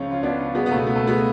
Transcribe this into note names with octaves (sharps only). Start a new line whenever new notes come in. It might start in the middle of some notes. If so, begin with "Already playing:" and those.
Already playing: C#2 C#3 F3 C#4 F4
F4
B3 D4
G#3 B3
B3
C#2 B2 A3
B3
A3
G#3 B3